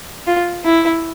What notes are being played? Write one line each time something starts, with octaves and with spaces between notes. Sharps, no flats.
F4
E4